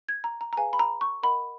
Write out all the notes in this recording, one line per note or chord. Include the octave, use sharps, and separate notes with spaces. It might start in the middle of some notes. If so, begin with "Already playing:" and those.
G#6
A#5
A#5
A#5
G#4 B4 F5 G#5
B5
A#5
C#6
A#4 D#5 F#5 B5